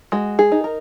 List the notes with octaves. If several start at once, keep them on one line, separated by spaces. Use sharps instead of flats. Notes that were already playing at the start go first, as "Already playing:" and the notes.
G#3 F#4
G#4
D#4
A#4